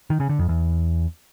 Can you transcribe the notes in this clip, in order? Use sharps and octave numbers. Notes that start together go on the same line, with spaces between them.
D#3
C#3
D3
F2
E2